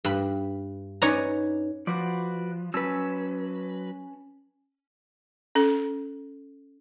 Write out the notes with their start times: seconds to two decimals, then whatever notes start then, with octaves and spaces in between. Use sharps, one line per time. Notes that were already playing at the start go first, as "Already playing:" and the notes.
0.05 G2 B5
1.02 C#4 D#4 B4 C#5 D5 A#5
1.87 F3 F#4 B4 D5
2.74 F#3 C#4 B4 A5 E6
5.55 C#4 A4